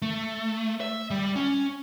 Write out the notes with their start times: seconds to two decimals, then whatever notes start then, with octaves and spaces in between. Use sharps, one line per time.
0.02 A3
0.81 E5
1.11 G3
1.36 C#4